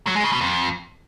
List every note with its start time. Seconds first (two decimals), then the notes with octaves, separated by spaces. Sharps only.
0.07 F#3
0.16 G#3
0.24 C#3
0.32 B2
0.41 F2